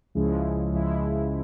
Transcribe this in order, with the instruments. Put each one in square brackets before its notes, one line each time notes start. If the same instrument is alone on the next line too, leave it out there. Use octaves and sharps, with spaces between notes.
[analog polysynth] C#2 C#3 F3 G#3 E4
C#2 C#3 F3 G#3 E4
E4